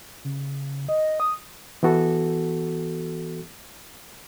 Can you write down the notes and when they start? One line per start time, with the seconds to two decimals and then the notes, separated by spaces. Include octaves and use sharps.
0.25 C#3
0.89 D#5
1.20 D#6
1.83 E3 B3 F#4 A4